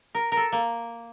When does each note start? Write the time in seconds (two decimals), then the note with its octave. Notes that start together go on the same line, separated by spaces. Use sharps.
0.15 A#4
0.32 A#4
0.37 A4
0.52 A#3